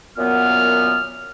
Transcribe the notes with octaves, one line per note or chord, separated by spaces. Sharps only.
F#2 A#2 B3 F6